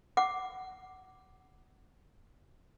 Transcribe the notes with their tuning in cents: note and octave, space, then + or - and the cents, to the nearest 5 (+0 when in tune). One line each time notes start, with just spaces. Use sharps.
F#5 +20 D6 +0